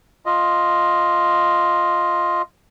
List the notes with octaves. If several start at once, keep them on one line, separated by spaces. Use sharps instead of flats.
F4 D#5